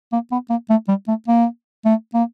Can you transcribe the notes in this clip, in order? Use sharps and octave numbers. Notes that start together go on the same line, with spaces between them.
A#3
B3
A#3
A3
G3
A3
A#3
A3
A#3